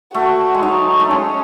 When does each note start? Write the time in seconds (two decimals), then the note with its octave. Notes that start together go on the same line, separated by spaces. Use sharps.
0.14 A3 F#4
0.55 G#3
0.62 F#3 D#4
1.00 A3
1.10 G#3 C#4